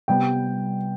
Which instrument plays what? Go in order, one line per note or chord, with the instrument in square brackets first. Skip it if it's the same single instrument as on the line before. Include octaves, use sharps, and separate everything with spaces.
[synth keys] C3 G3 B3 [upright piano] G5